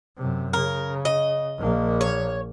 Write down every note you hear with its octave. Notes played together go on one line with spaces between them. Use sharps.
F#2 C3
C#3 A#4
D#5
A#1 A#3
C#5